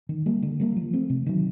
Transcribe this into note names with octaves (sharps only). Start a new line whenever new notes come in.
D#3
G3 A#3
D3
G3 A#3
F3
A3 C4
C3
D#3 F#3